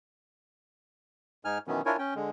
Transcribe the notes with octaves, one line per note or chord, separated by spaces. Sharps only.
G#2 D#4 G#5 F6
B2 D#3 E3 F#3 B3 C#4
D4 E4 F4 A#4 C#5 G#5
C#4 G5
D3 G#3